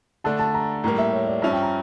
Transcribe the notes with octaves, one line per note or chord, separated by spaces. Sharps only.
D3 A3 D4 A5
A5
A#5
A2 G3 A#3 A#5
E5
C#5
D5
G2 F3 C#4 E5
G5
A#5